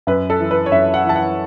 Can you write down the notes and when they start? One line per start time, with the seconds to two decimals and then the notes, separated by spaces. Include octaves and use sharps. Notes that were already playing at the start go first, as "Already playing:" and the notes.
0.07 F#2 B4
0.30 A4
0.39 E3
0.51 B4
0.66 C#5
0.72 F#2 E5
0.94 F#5
1.04 E3
1.09 A5
1.16 F#5